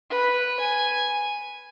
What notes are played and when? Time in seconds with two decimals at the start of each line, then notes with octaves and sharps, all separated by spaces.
0.10 B4
0.60 G#5